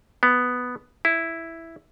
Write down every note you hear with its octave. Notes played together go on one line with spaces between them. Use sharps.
B3
E4